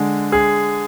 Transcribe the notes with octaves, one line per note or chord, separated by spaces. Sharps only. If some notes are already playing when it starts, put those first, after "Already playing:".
Already playing: D3 G#3
G#4